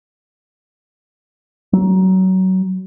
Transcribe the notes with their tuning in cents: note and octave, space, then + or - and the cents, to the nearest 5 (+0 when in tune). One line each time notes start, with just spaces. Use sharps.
F#3 +20